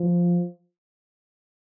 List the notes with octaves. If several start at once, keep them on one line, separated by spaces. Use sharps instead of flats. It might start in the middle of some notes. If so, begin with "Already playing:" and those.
Already playing: F3